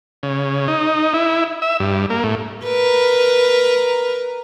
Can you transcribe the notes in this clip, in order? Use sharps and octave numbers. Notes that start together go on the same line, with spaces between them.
C#3
D#4
E4
E5
G2
A#3
A2
A#4 B4